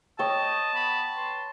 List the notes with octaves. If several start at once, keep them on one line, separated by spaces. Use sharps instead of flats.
C#5 D#5 G5 A5 D#6
B3 B5
B4 C6